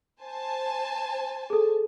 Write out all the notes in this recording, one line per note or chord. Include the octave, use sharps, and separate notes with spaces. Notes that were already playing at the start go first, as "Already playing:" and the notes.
C5 G#5 A5
G#4 A4